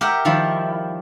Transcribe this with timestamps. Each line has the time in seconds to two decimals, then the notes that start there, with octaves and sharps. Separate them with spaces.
0.01 G4 A#4 E5 F#5 G5
0.25 D#3 F3 G3 E4